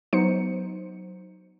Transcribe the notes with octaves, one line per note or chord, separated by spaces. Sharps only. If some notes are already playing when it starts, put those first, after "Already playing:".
F#3 B3 D#4 C5 C#7